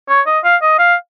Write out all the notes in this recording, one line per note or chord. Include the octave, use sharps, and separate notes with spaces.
C#5
D#5
F5
D#5
F5